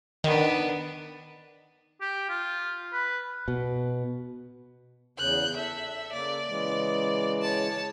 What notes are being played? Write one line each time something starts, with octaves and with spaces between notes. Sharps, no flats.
D#3 B3 D4
G4
F4
B4
B2
E2 C#3 F#6 G6
A4 E5
C#3 A#3 D5
C#3 E3 G#3
C#5 A5